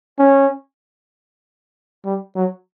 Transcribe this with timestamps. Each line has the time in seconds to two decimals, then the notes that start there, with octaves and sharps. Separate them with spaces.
0.19 C#4
2.05 G3
2.36 F#3